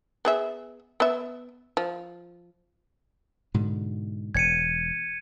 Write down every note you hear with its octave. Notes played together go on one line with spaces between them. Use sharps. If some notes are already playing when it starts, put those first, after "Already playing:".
B3 G#4 E5
B3 E5
F3
G#2 B2 D3
E1 G#6 C#7 D#7